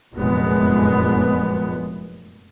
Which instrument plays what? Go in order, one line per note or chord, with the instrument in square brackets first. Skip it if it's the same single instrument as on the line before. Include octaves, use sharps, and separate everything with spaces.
[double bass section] F1 F#2 A#2 G#3 B3